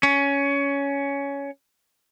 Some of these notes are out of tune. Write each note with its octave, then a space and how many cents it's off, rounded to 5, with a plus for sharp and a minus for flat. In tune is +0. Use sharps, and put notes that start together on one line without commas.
C#4 +15